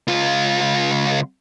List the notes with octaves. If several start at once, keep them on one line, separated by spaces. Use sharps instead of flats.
C#2 F4